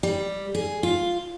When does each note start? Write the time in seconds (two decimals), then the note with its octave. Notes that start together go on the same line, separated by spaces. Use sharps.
0.03 G3
0.55 G#4
0.83 F4